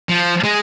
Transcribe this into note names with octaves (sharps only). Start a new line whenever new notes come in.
F3
G#3